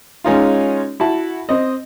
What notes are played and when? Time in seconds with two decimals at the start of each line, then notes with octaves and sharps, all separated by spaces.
0.24 G#3 C#4 D#4 F4
1.00 E4 F#4 A5
1.49 C4 D#5